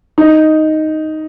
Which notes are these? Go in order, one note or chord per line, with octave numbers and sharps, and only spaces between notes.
D#4